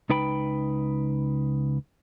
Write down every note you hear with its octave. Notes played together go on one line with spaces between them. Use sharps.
C#2 D#4 B4 G5 B5